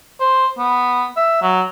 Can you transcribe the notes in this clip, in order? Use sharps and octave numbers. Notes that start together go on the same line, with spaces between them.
C5
B3
E5
F#3